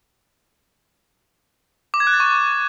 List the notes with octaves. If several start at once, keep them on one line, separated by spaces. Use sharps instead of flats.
D6
G#6
F#6
A6
C#6